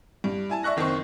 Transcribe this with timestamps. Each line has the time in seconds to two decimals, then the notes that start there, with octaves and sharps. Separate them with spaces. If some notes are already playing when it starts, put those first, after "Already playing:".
0.24 G2
0.50 E4 G#5 A5
0.63 D5 E5 C#6 F#6 A#6
0.76 F#1 D#3 C4 C#6